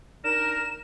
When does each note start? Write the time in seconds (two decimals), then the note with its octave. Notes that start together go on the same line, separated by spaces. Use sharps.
0.24 D4 D#4 A#4 E7